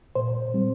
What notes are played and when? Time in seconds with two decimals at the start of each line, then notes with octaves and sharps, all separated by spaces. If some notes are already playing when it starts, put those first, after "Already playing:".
0.15 A#2 C5
0.54 G3 C4